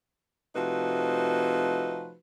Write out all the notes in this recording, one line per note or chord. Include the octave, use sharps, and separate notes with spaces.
C3 F3 A3 D#4 F#4 B4